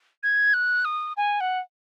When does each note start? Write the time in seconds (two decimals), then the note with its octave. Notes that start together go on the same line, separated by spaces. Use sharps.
0.23 G#6
0.54 F#6
0.85 D#6
1.17 G#5
1.40 F#5